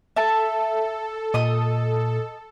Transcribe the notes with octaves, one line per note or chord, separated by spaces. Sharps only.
A4 E5 A5
A#2 D#5 D#6